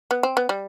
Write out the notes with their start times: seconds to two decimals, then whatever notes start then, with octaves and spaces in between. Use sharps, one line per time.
0.11 B3
0.23 C4
0.37 B3
0.49 G3